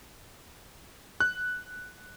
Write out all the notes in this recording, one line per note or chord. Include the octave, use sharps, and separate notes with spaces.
F#6